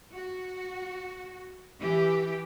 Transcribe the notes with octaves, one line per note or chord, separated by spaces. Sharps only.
F#4
E3 G4